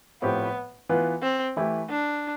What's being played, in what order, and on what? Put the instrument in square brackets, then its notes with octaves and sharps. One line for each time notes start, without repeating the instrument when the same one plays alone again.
[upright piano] A2 F3 C4 G4 [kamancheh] B3
[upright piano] E3 B3 F4 B4
[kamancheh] C4
[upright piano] E3 A3 E4 G4
[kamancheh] D4